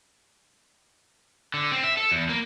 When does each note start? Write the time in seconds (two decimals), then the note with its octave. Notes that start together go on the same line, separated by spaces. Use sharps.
1.54 D3
1.72 C4
1.84 E5
1.97 A4
2.11 E2
2.29 A#3